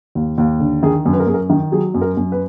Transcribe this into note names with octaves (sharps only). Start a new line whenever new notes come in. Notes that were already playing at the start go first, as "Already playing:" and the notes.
D#2
D#2
D3
D#3 G#4
F#2
B4
A#4
F#2 G#4
A#4
D#3
F#3 G#4
F#2
A#4
F#2
B4